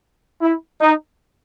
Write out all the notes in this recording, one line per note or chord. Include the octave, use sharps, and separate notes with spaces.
E4
D#4